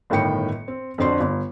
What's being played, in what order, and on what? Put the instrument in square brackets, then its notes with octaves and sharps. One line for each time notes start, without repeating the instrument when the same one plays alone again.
[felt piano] G1 A2 D#3 G5 C#7
C4
F2 D3 F#4 C5 D5 C6
G1